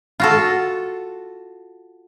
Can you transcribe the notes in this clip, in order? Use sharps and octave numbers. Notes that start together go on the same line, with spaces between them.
F4 F#4 A4